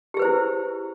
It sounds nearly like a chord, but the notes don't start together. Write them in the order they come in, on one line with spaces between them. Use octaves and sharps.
G4 G#4 B4 C5 E4